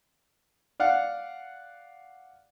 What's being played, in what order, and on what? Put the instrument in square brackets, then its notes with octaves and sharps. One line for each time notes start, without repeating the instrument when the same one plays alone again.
[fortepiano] D5 F5 F#5